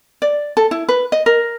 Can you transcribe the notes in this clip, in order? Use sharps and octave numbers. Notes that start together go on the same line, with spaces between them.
D5
A4
E4
B4
D#5
A#4